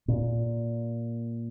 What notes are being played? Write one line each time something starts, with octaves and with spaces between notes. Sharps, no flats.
A#2